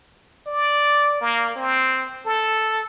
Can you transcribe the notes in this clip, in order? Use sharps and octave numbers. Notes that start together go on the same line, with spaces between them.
D5
A#3
C4
A4